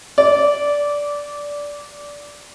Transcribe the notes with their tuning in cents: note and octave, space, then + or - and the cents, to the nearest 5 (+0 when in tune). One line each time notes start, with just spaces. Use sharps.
D5 -15